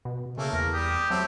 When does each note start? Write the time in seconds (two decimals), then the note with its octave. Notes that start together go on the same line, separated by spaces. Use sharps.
0.05 B2
0.38 C#3 A3 A#3
0.53 E2 A#4
0.73 G3 G4 D#6
1.10 F#3 A3 C4 A4